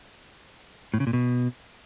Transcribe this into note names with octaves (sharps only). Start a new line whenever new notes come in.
A2
C#3
A#2
B2